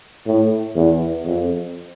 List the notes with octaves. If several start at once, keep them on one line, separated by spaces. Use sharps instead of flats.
A2
E2
F2